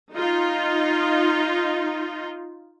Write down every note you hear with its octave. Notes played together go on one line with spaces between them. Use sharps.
D#4 F4